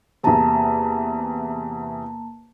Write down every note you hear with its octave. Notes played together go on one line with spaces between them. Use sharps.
E2 C3 A#3 A5 A#5